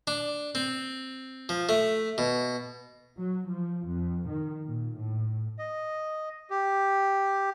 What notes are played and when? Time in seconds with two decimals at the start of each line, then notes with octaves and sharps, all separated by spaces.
0.07 D4
0.55 C4
1.49 F3
1.69 A3
2.18 B2
3.18 F#3
3.49 F3
3.87 F2
4.29 D#3
4.64 A#2
4.96 A2
5.58 D#5
6.50 G4